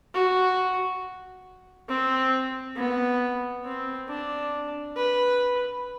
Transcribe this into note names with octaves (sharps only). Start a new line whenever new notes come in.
F#4
C4
B3
C4
D4
B4